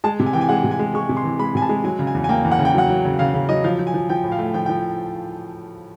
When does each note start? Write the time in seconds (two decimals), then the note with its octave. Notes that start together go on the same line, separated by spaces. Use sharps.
0.04 G#3 A5
0.19 C3
0.26 G#5
0.33 E3 G5
0.41 G#5
0.49 G#3 F#5
0.64 C3
0.71 G#5
0.79 G#3
0.94 G#3 C#6
1.09 C3
1.17 C6
1.24 E3
1.39 G#3 B5
1.55 C3 G#5
1.62 A5
1.69 G#3
1.84 F#3 G#5
1.99 C#3
2.07 G#5
2.15 E2
2.24 G#5
2.29 A#3 G5
2.44 E2
2.51 F#5
2.59 C#3
2.65 G5
2.74 F#3 F#5
2.89 F#3
3.05 C#3
3.19 C#3 F5
3.34 C#3
3.49 F#3 D#5
3.64 F3 F5
3.79 F3
3.87 G#5
3.94 F3
4.09 F3 G5
4.24 A2
4.32 F5
4.39 A3
4.54 F3 G5
4.66 F3 G5